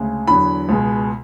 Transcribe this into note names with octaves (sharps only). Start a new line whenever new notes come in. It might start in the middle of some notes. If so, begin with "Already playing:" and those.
Already playing: D2 C#3 G#3
E2 D3 F#3 B5
C#2 B2 G#3